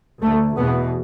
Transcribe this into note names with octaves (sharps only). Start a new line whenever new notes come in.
D2 A3
E2 B2 B3